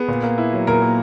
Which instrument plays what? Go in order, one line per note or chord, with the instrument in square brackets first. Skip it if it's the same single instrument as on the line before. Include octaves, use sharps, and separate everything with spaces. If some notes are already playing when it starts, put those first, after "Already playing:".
Already playing: [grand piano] B3 [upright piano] G#4
[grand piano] A#2
A#3
E4
F#3
[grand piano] A#2 [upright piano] A#4
[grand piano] A#3